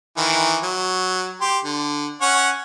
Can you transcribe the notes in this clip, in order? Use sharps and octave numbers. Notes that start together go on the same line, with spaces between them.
D#3 E3
F#3
G4 C6
D3
C#4 C#5 F#5